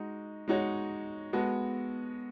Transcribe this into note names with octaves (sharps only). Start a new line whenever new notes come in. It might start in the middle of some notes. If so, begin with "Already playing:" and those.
Already playing: G#3 D#4 F#4
G#3 D#4 F#4 C#5
G#3 B3 F#4 A4